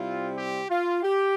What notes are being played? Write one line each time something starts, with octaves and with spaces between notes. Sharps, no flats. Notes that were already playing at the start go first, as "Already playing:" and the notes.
Already playing: C3 G3 C4 E4 F4
G4
F4
G4